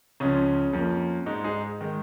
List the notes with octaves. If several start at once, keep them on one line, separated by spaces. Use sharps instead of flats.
C#2 C#3 F3 C#4
F2 F3 A#3
G#2 G#3 D#4
D#4 G#4
D#3 G#3